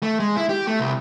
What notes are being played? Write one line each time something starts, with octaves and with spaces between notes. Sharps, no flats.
A3
G#3
E4
G4
A3
C2